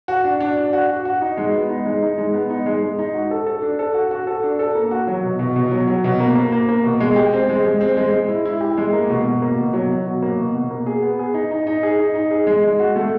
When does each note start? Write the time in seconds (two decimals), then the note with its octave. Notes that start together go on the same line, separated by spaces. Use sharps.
0.08 F#4
0.24 D4
0.40 D4
0.57 D4
0.73 F#4
0.89 F#4
1.05 F#4
1.22 D#4
1.37 G#3
1.53 B3
1.69 D#4
1.86 G#3
2.02 D#4
2.18 G#3
2.34 B3
2.50 D#4
2.66 G#3
2.82 G#3
2.99 D#4
3.14 F#4
3.31 A4
3.46 A4
3.62 D4
3.79 A4
3.94 F#4
4.11 F#4
4.27 A4
4.43 D4
4.59 A4
4.75 A#3
4.91 F#4
5.07 F#3
5.23 B2
5.39 B2
5.56 B2
5.71 F#3
5.87 F#3
6.04 B2
6.20 A#3
6.35 A#3
6.52 A#3
6.69 A#3
6.84 B2
7.00 G#3
7.16 G4
7.33 C4
7.49 G#3
7.65 G#3
7.81 C4
7.97 G#3
8.13 G#3
8.28 E4
8.45 E4
8.61 G4
8.77 G#3
8.93 A#3
9.10 B2
9.25 B2
9.42 A#3
9.58 B2
9.73 F#3
9.90 B2
10.06 F#3
10.22 A#3
10.38 B2
10.55 B2
10.71 A#3
10.86 G#4
11.02 B3
11.19 G#4
11.34 D#4
11.51 D#4
11.67 D#4
11.83 G#4
11.99 D#4
12.15 D#4
12.31 G#4
12.47 G#3
12.64 G#3
12.80 F#4
12.96 A3